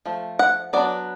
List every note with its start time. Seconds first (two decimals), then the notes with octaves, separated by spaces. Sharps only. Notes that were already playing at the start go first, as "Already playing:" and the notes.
0.06 F3 A3
0.39 F#5
0.73 F#3 B3 D4 D5